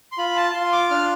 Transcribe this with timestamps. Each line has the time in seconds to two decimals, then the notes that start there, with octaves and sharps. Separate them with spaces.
0.12 C6
0.18 F4 B5
0.36 A5
0.54 F4 C6
0.72 D6
0.90 D4 F6